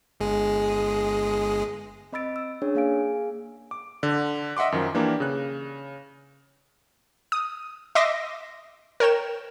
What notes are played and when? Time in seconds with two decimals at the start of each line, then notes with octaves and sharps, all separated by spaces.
0.20 G1 G#3 G#4
2.12 C4 D#5 B5 E6 A6 D7
2.36 E6
2.62 C#4 D4 G#4 C#5
2.75 A#3 G#4 F5 G#5 D7
3.71 D6
4.03 D3
4.57 D#5 E5 F#5 C6 D6
4.72 F#2 D#3 F3
4.94 E3 A#3 D4 G4 A#4
5.20 C#3 F#6
7.32 D#6
7.95 D#5 E5 C6 D6 E6 A#6
9.00 A#4 C#5 G5 E7